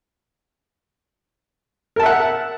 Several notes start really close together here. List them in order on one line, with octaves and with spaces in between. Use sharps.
A#4 A5 E5 F#5